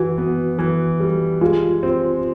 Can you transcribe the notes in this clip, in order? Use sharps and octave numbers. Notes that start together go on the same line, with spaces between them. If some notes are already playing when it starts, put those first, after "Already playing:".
Already playing: E3 F#4
B3
E3
G3
G#3 F4
C4